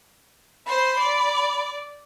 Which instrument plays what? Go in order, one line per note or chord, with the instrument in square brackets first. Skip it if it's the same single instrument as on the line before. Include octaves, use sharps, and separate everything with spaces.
[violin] C5 C6 [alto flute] B5
[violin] D5